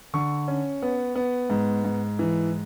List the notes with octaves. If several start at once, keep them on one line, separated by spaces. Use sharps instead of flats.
D3 C#6
C#4
B3
B3
G#2
G#2
E3